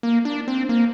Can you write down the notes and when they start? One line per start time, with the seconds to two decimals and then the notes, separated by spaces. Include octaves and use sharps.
0.03 A#3
0.25 D4
0.48 C4
0.69 A#3